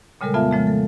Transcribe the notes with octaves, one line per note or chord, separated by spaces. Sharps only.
A#2 C#3 G3 G#3 A4 A#4
F2 B3 F4 E5 F5 A5
C#3 F3 G#3 A3
A4